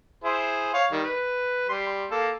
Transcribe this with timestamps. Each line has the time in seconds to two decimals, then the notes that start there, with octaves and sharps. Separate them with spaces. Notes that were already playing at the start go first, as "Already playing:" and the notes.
0.24 E4 G#4 C5
0.74 C#5 F5
0.91 D#3 G3
1.04 B4
1.69 G3 C6
2.11 A#3 A4